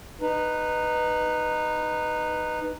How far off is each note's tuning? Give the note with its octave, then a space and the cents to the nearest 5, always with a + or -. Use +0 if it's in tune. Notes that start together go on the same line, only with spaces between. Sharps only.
D#4 -15 B4 +0